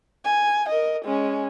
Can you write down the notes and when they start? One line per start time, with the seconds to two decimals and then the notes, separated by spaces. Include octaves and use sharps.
0.25 G#5
0.69 A#4 D#5
1.05 G#3 C#4